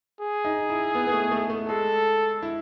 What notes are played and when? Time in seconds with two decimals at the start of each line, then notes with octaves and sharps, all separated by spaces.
0.21 G#4
0.45 D#4
0.70 E4
0.95 B3
1.07 B3
1.13 A3
1.31 A3
1.50 A3
1.68 G#3 A4
2.42 E4